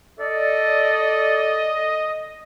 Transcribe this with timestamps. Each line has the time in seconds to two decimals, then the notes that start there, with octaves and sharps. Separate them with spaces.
0.19 A4 D5 D#5